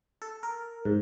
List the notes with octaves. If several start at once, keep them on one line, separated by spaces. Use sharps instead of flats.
A4
A#4
G#2